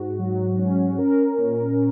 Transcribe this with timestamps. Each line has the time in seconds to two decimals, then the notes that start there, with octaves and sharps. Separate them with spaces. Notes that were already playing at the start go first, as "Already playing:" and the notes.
Already playing: G#2 F#4
0.19 F#3
0.59 C#4
0.98 A#4
1.38 A#2